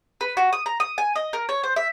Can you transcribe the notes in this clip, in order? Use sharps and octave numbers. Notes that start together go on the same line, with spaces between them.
B4
F#4
D#6
A#5
D#6
G#5
D#5
A#4
C#5
C5
E5